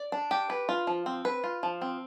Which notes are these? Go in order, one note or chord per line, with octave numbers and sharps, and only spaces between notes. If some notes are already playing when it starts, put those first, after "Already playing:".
Already playing: D5
D4
G4
B4
F4
F3
C4
B4
F4
F3
C4